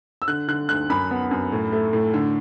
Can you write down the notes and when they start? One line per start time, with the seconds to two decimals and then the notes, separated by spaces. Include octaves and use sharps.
0.22 E6
0.28 D3 F#6
0.48 D3 F#6
0.69 D2 F#6
0.89 F#2 B5
1.11 B3
1.31 F#2
1.52 A2
1.72 A3
1.93 A2
2.14 D3